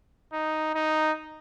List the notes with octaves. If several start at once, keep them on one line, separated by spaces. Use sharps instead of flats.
D#4
D#4